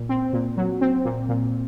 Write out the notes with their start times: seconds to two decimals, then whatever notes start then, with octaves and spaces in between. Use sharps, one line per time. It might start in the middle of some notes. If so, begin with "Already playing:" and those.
Already playing: A#2
0.09 C4
0.33 A#2
0.57 F#3
0.81 C4
1.05 A#2
1.29 A#2